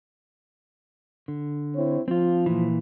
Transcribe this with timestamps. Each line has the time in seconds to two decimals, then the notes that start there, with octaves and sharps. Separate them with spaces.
1.28 D3
1.75 C4 E4 C#5
2.08 F3 C4 F4
2.46 A#2 E3